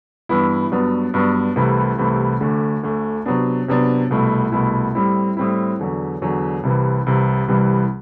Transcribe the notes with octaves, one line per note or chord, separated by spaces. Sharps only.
G2 E3 B3 E4
G2 F#3 B3 D4
G2 F#3 B3 D4
C2 C3 E3 A3 E4
C2 C3 E3 A3 E4
D2 D3 A3
D2 D3 A3
C3 F#3 B3 D4
C3 F#3 B3 D4
C2 B2 A3 E4
C2 B2 A3 E4
A2 G3 C4 E4
A2 G3 C4 E4
E2 D3 F#3
E2 D3 F#3
C2 C3 E3
C2 C3 E3
C2 C3 E3 G3